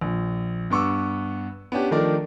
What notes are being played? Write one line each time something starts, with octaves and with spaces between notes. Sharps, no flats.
A#1
G2 B3 C#6 D6 E6
B3 C#4 D4 G4
D#3 F3 A3 D4 A#4 D5